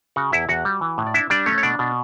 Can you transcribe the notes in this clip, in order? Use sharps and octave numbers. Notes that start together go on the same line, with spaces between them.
C#3 F#4 F#5
E2 E4 E5
E2 F#4 F#5
G3
E3
A2
D5
D4 E4 E5
G3 D4 D5
A3 C#4 C#5
C#5
B2 D4 D5
B2